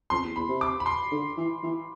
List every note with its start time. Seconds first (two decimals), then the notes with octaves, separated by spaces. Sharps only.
0.10 F2 C6
0.24 E2
0.36 E2 B5
0.49 C3
0.61 D6
0.80 B5
0.86 C6
1.11 D3
1.37 E3
1.63 E3